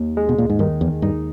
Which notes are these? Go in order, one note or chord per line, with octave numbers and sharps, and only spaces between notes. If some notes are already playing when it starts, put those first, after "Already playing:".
Already playing: D#2
G#3
B2
A#2
G#2
G2 D#3
E2
G2 D#4